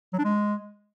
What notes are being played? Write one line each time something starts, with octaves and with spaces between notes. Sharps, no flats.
F#3
D4
G#3